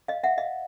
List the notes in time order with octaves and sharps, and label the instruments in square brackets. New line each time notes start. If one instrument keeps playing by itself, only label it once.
[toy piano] D#5 F5
E5 F#5
D#5 F5